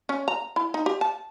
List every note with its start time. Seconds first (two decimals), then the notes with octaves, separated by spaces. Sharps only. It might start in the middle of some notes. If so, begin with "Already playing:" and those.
0.09 C#4
0.28 A#5
0.56 E4
0.74 D#4
0.86 G4
1.01 A5